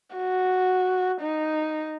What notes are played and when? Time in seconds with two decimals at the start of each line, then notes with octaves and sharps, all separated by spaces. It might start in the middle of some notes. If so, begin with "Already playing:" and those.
0.16 F#4
1.22 D#4